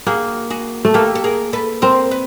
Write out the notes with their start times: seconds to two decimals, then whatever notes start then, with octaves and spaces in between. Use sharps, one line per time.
0.06 A#3 F#4 G#4
0.50 F#4 G#4
0.85 A3
0.94 A#3 G4 A4
1.15 A4
1.24 G#4 A#4
1.53 A4 B4
1.82 C4 A#4 C5
2.11 B4